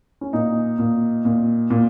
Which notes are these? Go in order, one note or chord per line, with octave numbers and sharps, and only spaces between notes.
C#4
A#2 D#4
A#2
A#2
A#2